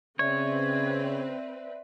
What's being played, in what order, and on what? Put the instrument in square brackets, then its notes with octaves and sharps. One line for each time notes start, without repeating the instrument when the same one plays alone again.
[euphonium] C#3 [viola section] C4 B4 [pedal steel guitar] C#5 [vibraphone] D5 E5